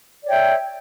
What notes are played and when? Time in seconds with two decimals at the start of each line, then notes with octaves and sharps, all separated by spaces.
0.22 D5
0.25 C#5
0.28 G5
0.31 E5